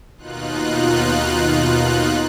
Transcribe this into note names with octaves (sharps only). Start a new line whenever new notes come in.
D#2 B2 D#4 F4 F#6